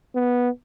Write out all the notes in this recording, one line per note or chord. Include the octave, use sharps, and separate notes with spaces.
B3